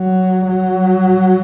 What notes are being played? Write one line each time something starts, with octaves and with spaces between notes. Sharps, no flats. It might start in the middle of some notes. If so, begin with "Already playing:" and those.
Already playing: F#3
F#3